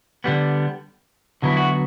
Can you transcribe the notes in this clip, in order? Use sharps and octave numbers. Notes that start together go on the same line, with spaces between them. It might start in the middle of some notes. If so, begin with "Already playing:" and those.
D3 G3 B3
D3 F#3 B3 E4
F#4